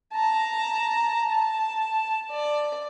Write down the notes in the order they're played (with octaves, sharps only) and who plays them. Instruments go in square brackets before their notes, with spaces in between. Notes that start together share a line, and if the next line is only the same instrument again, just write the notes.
[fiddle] A5 A#5
A5
D5